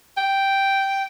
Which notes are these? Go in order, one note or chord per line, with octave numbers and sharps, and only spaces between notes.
G5